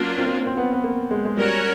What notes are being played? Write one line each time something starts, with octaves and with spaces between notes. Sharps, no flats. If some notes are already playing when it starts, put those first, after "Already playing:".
Already playing: F#3 A#3 C#4 D4 F4 A#4
C4
C4
B3
B3
A#3
G#3
G#3
G3 C#4 F#4 A#4 C#5